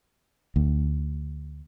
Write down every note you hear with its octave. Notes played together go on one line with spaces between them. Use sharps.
D2